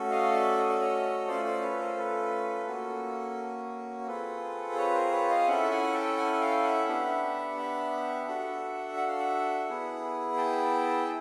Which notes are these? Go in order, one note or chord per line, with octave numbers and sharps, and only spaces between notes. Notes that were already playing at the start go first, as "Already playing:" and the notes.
Already playing: A3 C#4 F#4 A4
D#5 F5
D5 E5
D#5
D5
C#5 D#5
A3 C#4 F4 A4 C5 D5
C5 D5
B4 C#5
A#4 C5
A4 B4
A#3 C#4 F#4 A4
C4 F4 G#4 A4 B4
B4 C#5
A#4 C5
B4 C#5
D#5 F5
C#4 E4 A4 E5 F#5
A5
F#5 G#5
G5 A5
F#5 G#5
F5 G5
E5 F#5
B3 D4 G4
E5 F#5
D4 F#4 A4
F#5
F5
E5 F#5
B3 E4 G#4
G5 A5